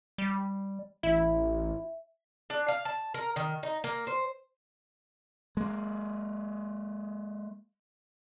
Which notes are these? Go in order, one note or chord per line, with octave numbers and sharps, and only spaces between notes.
G3
A1 E4 E5
D4
F5
A5
A#4
D#3
D#4
A#3
C5
G#3 A#3